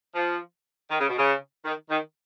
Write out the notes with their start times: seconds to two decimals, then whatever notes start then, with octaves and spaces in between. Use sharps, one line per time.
0.15 F3
0.89 D#3
0.99 C#3
1.09 B2
1.18 C#3
1.65 D#3
1.90 D#3